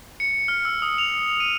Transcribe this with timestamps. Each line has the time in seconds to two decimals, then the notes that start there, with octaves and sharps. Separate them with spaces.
0.20 C#7
0.48 F6
0.65 E6
0.82 D#6
0.98 F7
1.40 D#7